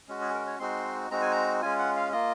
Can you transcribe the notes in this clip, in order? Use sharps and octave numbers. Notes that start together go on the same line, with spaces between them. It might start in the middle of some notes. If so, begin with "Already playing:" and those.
G#3 C#4 F#4
G#4
A#4
C#5
G#3 C4 D#4 F#4 C6
G#3 C4 D#4 F#4 A#5
G#5
A#5
G#3 C#4 F4 G#5
F#5
F5
A#3 F4 D#5